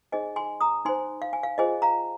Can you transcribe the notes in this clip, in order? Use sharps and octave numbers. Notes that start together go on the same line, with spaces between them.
D#4 G#4 C5 D#5 G#5
G#5 C6
A#5 D#6
D#4 C5 G#5 C6
F5
G#5
F5
F4 G#4 C5 D#5 G#5
F5 A#5